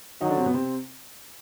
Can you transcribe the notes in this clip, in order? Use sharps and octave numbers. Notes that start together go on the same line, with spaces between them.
D#3 F#3 D#4
D3 D4
C3 C4
B2 B3
C3 C4